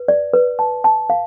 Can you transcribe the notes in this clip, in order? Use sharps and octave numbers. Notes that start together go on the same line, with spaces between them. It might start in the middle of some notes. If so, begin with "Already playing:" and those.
Already playing: B4
D5
B4
A5
A5
F5